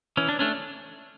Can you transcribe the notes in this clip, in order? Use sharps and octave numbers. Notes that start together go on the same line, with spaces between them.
E3 C#4
D4
A3 C#4 D4